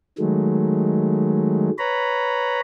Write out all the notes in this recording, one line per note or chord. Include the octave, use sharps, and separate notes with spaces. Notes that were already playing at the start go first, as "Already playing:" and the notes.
D#3 F#3 G#3 A3
B4 C#5 A#5 B5